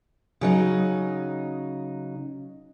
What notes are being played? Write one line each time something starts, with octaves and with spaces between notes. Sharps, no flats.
C#3 F#3 D#4